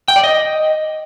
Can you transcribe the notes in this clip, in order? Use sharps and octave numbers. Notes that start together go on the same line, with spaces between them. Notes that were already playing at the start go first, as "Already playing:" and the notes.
G5
D5
D#5